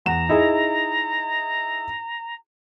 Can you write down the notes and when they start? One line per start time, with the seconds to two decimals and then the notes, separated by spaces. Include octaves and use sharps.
0.06 E2 F#5 A#5 E7
0.29 D#4 E4 G#4